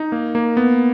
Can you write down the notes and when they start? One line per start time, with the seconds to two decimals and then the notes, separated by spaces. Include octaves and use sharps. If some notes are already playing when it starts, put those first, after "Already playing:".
Already playing: D#4
0.12 A#3
0.35 A#3
0.57 B3